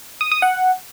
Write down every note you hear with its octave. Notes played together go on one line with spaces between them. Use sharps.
D#6
D#6
F#5